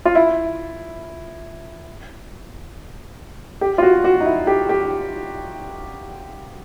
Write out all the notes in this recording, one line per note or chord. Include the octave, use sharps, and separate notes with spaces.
F4
E4
G4
F4
F#4
F#4
D#4
E4
G4
G4